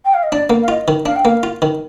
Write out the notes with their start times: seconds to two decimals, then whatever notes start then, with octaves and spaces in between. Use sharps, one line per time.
0.04 G5
0.13 F5
0.22 D#5
0.32 D4 D5
0.50 A#3
0.62 F5
0.68 F4 D#5
0.88 D#3
1.06 D4 F5
1.15 G5
1.25 A#3 F5
1.43 F4
1.62 D#3